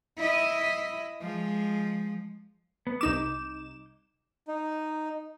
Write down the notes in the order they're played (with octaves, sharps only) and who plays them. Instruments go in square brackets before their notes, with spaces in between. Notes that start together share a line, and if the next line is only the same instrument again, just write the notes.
[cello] E4 D#5
F3 G#3
[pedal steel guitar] B3
[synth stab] C2 D#4 E7 [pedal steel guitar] D6 G6
[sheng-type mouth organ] D#4